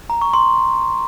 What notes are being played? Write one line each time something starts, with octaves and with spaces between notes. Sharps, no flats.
A#5
C#6
C6